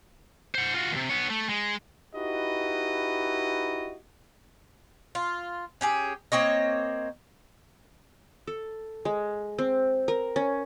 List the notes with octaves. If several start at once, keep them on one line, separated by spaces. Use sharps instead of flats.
C5 F#5
F4 F#4
D#2 C3
B3 C#5
A3
G#3
D#4 E4 F#4 G4 B4 D#5
F4
C#4 G4 G#4
A#3 C4 C#5 D#5
A4
G#3
C4
A#4
C#4